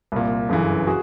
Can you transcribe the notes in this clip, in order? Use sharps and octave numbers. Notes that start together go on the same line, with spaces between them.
C2 A#2
G1 F#2 C#3 E3
F#4 G#4